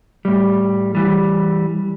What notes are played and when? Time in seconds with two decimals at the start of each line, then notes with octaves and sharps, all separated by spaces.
0.25 A2 G3
0.95 E3 G3